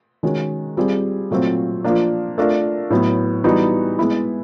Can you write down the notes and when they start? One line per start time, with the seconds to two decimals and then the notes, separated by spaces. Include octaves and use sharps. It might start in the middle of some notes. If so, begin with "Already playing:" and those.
0.23 D#3 G#3 C#4 F#4
0.77 G3 C4 F4 G#4
1.31 A#2 F#3 A3 C4 F4
1.84 F3 A#3 D4
2.38 A3 D4 F4 A#4
2.90 A2 F#3 B3
3.44 E3 G3 B3 D#4 F#4
3.99 G#3 B3 E4